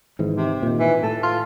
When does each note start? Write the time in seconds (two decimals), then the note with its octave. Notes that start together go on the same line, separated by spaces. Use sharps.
0.19 G#1 G#2 E3
0.35 C3
0.62 A#2 D#3
0.79 E3
1.03 A2 A4
1.23 F4